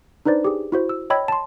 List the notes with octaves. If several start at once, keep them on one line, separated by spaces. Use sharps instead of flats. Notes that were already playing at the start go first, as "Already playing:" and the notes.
D4 D#4 B4 C5 D5
G4 G#4
E4 F#4 C5
E6
C#5 D#5 G5 B5 E6 G#6
A5 C6